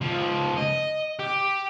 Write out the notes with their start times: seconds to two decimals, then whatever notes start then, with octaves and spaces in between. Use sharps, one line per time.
0.01 C#2 F3
0.56 D#5
1.19 G4